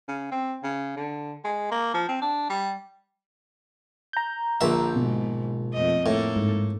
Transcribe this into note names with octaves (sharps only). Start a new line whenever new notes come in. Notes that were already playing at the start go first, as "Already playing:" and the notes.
C#3
C4
C#3
D3
G#3
A#3
F3
C4
D4
G3
A#5 G6
A#1 D3 E5
G#2 B2
F2 A3 D#5
A2 A#3 A4
G#2